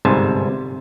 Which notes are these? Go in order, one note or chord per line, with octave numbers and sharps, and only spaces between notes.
G1 C2 G#2 C3 G#5 A5